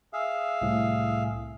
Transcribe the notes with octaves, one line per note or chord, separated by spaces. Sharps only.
G#4 E5 F5
C2 A2